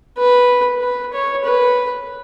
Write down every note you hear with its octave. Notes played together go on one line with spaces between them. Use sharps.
B4
B4
C#5
B4